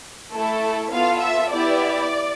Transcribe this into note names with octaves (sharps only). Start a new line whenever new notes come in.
A3 E4 A4
B3 F4 A4 F5
E5
B3 E4 G4 D5